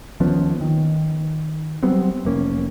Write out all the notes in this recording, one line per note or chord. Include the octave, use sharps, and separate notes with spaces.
D#2 F3 B3 C#4
D#3
F#3 G3 B3 C4
F1 A#3 C#4